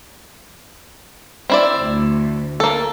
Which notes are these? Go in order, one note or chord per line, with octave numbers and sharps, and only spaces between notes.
C4 E4 D5
D2
A#3 A4